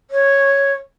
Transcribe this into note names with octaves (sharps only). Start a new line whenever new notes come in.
C#5